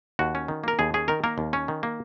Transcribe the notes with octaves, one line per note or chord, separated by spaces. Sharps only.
D#2 F#4
C#4
D#3
A#3 A#4
D#2 G#4
C#4 G#4
D#3 A#4
A#3 A#4
D#2
C#4
D#3
A#3